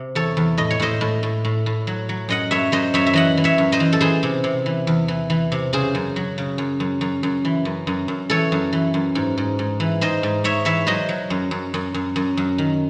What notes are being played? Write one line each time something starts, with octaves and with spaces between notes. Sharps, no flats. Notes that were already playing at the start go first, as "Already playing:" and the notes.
Already playing: C3
E2 A4 C#5
E2
A2 D#5
C#5
A2 C5 D#5
A2
A2
A2
A2
F#3
F#3
F#2 D#5 F#5
F#2 C#5 E5
F#2 C5 D#5
F#2 C#5 E5
E5
E3 D#5 F#5
E3
C#5 E5
F#2
C5 D#5
E3
A4
E3 G#4 C5
C3
C3
E3
E2
E3
E3
C3
C#3 G#4 C5
F#2
F#3
C#3
F#2
F#2
F#2
F#2
E3
F#2
F#2
F#2
E3 A4 C#5
F#2
E3
F#2
G#2
G#2
G#2
E3
G#2 C5 D#5
G#2
G#2 C#5 E5
E3 C#5 E5
F#3 C5 D#5
F#3
F#2
F#2
F#2
F#2
F#2
F#2
D#3